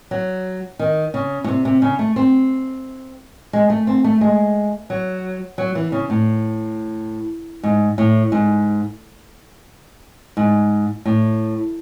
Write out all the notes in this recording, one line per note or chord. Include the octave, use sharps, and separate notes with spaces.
F#3
D#3
C#3
A2
C3
C3
C#3
A3
C4
G#3
A3
C4
A3
G#3
F#3
F#3
E3
C#3
A2
G#2
A2
G#2
G#2
A2